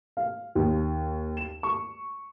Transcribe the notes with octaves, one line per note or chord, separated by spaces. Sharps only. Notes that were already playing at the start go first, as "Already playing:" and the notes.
F5
D#2
E7
C#6